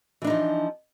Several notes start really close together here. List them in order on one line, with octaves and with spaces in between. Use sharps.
E3 D4 D#4 F3